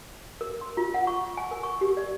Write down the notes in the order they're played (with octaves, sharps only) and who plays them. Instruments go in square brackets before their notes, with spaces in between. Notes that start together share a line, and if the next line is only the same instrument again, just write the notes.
[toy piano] A#4
C6
F4
F#5
C#6
G#5
A#4
C#6
G4
D5